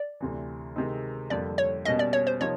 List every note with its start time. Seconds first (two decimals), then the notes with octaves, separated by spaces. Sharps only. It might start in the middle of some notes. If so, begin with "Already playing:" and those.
Already playing: D5
0.21 D2 C3 E3
0.76 C3 D#3 G#3 C4 D#4
1.30 F2 D3 G3 A#3 D5
1.58 C#5
1.85 B2 G3 A#3 C#4 D#5
1.99 D5
2.13 C#5
2.27 C5
2.41 C3 F3 A#3 D#4 C#5